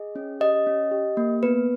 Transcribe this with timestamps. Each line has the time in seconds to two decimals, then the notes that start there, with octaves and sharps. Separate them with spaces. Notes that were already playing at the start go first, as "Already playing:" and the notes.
Already playing: G#4 D#5
0.15 C#4
0.40 G4 D#5
0.67 C#4
0.91 G4
1.17 A#3
1.43 B3 B4